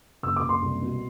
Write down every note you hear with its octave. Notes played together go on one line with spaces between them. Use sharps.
F#1 E6
D6
F#1
C6
C2
B2